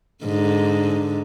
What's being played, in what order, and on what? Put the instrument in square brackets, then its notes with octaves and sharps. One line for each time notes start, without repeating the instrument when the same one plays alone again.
[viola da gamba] G#2 D3